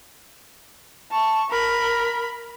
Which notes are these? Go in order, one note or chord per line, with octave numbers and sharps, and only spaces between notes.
A5 C#6
A#4 B5